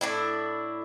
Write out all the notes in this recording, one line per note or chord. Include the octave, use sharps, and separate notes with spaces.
A2 D4 E4